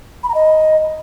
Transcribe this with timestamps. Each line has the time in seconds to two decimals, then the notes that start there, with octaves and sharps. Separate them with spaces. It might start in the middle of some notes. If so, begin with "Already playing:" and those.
0.23 B5
0.29 A#5
0.35 D#5